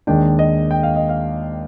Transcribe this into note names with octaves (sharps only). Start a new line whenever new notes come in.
D#2 D#3 G#3 D4 G5
D#5
G5
F5
D#5
F5